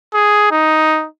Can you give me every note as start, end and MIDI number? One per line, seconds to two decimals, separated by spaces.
0.14 0.49 68
0.51 1.06 63